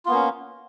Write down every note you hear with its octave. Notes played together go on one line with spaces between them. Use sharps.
A#3 B3 C#4 F4